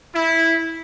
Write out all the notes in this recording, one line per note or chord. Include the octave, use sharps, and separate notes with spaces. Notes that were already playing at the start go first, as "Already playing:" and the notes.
E4